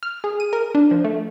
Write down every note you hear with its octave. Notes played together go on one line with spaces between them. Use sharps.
F6
G#4
D#7
A#4
D4
F3
A3